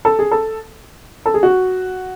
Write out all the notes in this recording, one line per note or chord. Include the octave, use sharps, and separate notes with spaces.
A4
G#4
A4
A4
G#4
F#4